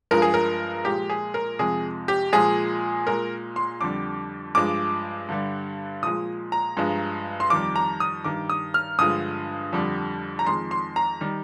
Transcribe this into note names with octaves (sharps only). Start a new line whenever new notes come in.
G2 F3 G#3 A#4
G#4
A#4
A#2 F3 G#3 G4
G#4
A#4
F2 C3 F3 G#3 G#4
G4
A#2 F3 G#3 G#4
A#2 G#3 A#4
C6
F2 D3 G3 D6
G2 F3 G#3 D6
G2 D3 G3
A#2 F3 G#3 D#6
A#5
G2 F3 G#3
C6
F2 D#3 G3 D6
A#5
D#6
G2 D#3 G3 D6
D#6
F6
G2 D3 F3 G#3 D#6
F2 D3 G3
A#5
F2 D#3 G#3 C6
C6
A#5
D#3 G3